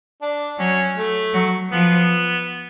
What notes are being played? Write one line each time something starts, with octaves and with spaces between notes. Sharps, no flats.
D4
F#3 C#4
A3
F#3
F3 B3